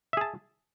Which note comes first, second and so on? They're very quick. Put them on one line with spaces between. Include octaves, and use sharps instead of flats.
E5 G#4 A5